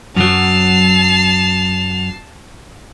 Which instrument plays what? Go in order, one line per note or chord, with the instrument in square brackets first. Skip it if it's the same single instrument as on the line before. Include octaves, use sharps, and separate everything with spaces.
[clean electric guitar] F#2 F#3 [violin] A5 C7 [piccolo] F7